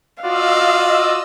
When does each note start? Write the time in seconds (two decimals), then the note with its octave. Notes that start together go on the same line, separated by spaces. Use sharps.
0.23 F4 F#4 D5 D#5 F5 E6